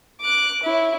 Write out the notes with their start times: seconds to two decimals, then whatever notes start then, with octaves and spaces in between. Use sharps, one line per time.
0.21 D6 F#6
0.63 E4 C#5